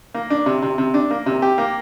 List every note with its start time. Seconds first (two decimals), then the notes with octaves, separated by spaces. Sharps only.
0.14 A#3
0.30 D4
0.46 C3
0.62 C3
0.78 C3
0.94 D4
1.11 A#3
1.26 C3
1.42 G4
1.58 A#3